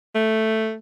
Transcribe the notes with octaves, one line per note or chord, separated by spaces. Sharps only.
A3